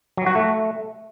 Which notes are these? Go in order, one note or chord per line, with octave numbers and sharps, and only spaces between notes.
F#3
F#4
A3